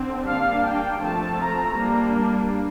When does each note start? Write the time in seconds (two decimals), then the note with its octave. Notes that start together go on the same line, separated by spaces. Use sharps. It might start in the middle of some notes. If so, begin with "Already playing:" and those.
Already playing: D3 C4
0.25 G3 A#3 D4 F5
0.63 G5
1.00 F3 A3 C4 A5
1.39 A#5
1.76 G3 A#3 D4